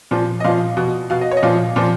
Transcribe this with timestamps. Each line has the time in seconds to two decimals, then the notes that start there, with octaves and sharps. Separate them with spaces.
0.11 A#2 F3
0.40 D#5
0.44 A#2 F3 F5
0.77 B2
1.10 B2 F5
1.21 D#5
1.31 C#5
1.37 D#5
1.43 A#2 F3 F5
1.76 A#2 F3